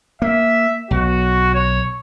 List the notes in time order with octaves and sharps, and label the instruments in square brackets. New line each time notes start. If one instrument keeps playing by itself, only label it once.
[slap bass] A#3 [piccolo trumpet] E5
[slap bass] B1 [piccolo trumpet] F#4
[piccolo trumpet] C#5